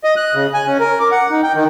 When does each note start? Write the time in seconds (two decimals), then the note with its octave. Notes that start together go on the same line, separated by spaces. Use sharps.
0.04 D#5
0.17 F#6
0.34 C#3
0.54 G#5
0.67 C#4
0.80 A#4
1.00 D6
1.12 F#5
1.30 D#4
1.43 G5
1.55 D#3